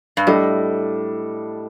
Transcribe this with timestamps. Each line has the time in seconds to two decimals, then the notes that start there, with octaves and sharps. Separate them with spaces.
0.17 G2
0.27 A2 G3 D4 A4 D#5